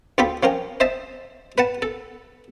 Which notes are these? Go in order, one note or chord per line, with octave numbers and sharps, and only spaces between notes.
D2 F4 A4 G5 B5
F3 C#4 A#4 G5
C5 D#5 E5 A5
B4 F#5 A5
A4